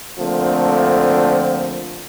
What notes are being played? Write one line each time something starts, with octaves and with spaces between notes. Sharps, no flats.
D3 F3 A3 A#3 C4